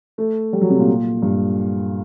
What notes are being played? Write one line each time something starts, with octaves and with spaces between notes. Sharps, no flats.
A3
G3
F#3
C3
A#2
G2